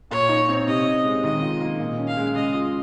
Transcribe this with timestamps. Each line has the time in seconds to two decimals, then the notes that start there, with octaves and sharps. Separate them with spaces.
0.11 A#2 C#5
0.29 D#4
0.49 C4
0.67 C3 D#5
0.86 C3
1.04 G#3
1.23 D#3 D#5
1.42 F4
1.61 A#3
1.79 A#2
1.98 C#4
2.08 F5
2.17 G#3
2.35 C#3 D#5
2.54 F4